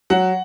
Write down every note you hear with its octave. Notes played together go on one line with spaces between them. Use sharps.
F#3 F#5